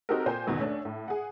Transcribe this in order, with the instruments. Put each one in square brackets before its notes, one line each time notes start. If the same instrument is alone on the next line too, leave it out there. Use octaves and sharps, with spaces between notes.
[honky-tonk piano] C4 D#4 F#4 G4 A4 A#4
A#2 C5 G5 G#5
A1 E2 B2 D#3
A3 C#4 D4
A2
G#4 F#5